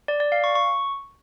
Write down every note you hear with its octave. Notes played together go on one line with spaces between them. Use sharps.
D5
D5
F5
C#6
C#6